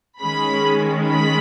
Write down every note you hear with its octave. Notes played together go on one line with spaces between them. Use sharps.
D#3 G#3 C#4 B5
B5